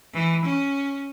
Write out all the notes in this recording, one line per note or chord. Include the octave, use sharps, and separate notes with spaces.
E3
C#4